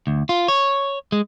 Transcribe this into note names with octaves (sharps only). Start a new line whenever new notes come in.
D2
F4
C#5
G#3